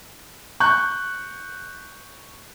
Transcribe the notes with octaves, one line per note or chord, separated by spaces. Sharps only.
C#6 F#6 G6